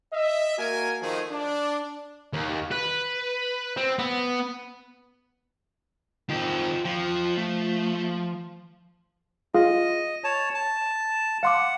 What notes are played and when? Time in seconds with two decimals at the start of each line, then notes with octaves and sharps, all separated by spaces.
0.13 D#5 E5
0.58 A#3 F#4 A#4 G#5
1.01 D#3 F3 A3 F#4 G#4
1.30 D4
2.33 D#2
2.71 B4
3.77 C4
3.99 B3
6.29 D#3 C4 F4 G5
6.85 F3 F4 G5
7.37 A3
9.54 F4 G#4 D#5 F5
10.24 C#5 A5
10.54 A5
11.43 F5 F#5 C6 D6